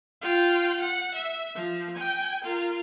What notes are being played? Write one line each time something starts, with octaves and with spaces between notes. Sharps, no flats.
F4 G5
F#5
E5
F3
G5 G#5
F4 A#4